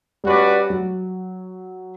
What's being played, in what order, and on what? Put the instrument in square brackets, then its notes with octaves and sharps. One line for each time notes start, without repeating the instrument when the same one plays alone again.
[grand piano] G3 [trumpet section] C#4 F#4 B4 D5
[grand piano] F#3